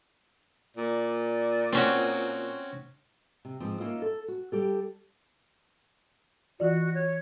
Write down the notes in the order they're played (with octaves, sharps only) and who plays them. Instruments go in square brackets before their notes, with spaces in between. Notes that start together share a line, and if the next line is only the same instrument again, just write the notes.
[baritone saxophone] A#2 [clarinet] D5
[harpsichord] C4 C#4 F#4
[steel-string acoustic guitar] C3
G#2 F3 C4
A#3 C#4 D#4 F4 E5
A4
F#4
G3 G4 A4
[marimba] E3 F4 D5 [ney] F#4
[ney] C#5